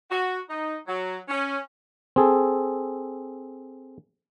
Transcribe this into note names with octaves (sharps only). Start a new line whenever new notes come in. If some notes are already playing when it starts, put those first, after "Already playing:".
F#4
D#4
F#3
C#4
C4 G#4 A4